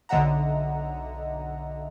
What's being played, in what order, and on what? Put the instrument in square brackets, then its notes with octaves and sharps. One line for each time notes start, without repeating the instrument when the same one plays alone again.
[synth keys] B1 D3 D#5 E5 F#5 A#5